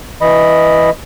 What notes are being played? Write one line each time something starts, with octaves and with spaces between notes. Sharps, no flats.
E3 D#5 B5